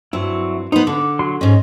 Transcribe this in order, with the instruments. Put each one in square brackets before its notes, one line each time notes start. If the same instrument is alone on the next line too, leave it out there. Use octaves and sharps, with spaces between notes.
[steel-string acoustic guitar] G2 C4 [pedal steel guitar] F#3 E4
[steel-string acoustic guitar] B3 C5 [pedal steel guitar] D#4
[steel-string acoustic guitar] D3 [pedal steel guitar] D6
[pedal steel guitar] F#3 C6
[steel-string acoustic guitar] G#2 C#4 [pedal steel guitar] D#5